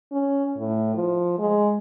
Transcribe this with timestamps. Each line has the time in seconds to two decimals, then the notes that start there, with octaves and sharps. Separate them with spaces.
0.12 C#4
0.58 A2
0.96 F3
1.39 G#3